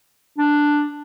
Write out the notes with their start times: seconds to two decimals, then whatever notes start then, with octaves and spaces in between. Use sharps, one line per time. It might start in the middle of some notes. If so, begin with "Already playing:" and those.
0.38 D4